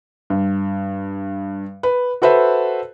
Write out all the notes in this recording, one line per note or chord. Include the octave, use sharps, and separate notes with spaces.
G2
B4
F#4 A4 B4 C5 E5